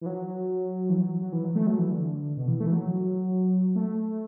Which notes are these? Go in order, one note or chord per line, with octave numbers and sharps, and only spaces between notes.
E3
F#3
E3
F#3
F#3
E3
F#3
A3
F#3
E3
D3
B2
E3
A3
E3
F#3
A3